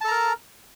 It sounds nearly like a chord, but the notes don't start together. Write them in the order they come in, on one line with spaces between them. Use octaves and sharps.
A5 A4 A#5 A#4